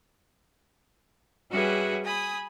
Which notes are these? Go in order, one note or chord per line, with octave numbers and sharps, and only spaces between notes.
G3 C#4 F#4 G#4 B4 E5
G#5 B5 D#6